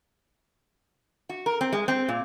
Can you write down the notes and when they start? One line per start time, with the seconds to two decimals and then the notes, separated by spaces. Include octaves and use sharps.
1.29 F#4
1.46 A#4
1.61 C4
1.72 G#3
1.88 C4
2.08 A#2